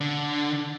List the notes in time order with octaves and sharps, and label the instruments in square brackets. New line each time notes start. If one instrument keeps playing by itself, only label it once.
[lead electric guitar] D3